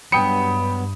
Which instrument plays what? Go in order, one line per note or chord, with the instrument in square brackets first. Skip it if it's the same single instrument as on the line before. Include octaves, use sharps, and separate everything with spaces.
[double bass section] G2 [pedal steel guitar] F#3 B3 [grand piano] G5 D#6 C#7 [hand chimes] B5